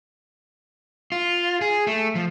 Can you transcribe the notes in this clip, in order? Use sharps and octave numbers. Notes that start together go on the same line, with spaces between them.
F4
G#4
A3
F3